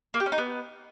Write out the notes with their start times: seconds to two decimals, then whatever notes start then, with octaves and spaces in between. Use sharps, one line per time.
0.14 A#3
0.20 G4
0.26 C#4
0.32 D#4
0.38 B3